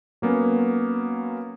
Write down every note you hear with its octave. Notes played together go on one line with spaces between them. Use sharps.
F#3 A#3 B3 C#4